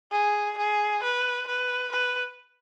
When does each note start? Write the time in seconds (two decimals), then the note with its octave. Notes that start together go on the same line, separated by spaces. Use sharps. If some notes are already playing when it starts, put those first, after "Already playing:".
0.12 G#4
0.58 G#4
1.03 B4
1.48 B4
1.92 B4